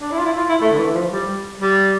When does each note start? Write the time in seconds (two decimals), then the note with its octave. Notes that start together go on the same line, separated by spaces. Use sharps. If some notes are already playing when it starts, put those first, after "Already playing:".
0.01 D4
0.12 E4
0.19 F4
0.25 E4
0.37 F4
0.49 E4
0.62 A3
0.71 D3
0.78 E3
0.95 F3
1.11 G3
1.60 G3